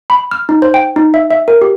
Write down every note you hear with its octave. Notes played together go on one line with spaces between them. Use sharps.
B5
F6
D#4
C5
G5
D#4
E5
E5
A#4
G4